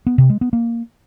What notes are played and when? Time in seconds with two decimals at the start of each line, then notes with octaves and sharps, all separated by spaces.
0.07 B3
0.18 C3
0.30 G#3
0.41 B3
0.53 A#3